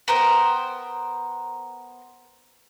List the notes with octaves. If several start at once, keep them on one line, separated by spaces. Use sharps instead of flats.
B3 A#4 C5 G5